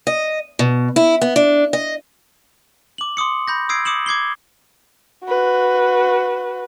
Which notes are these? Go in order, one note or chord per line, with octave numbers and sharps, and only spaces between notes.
D#5
B2
E4
B3
D4
D#5
D6 F#7
C6 D6 D#6 C#7
B5 G6 A#6
D#6 E6 G#6 C7 D7
D6 D#6 C#7 E7 F#7
D6 G#6 C7 G7
F#4 B4